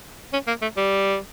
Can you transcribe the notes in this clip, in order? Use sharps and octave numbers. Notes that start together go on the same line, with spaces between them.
C#4
A#3
A3
G3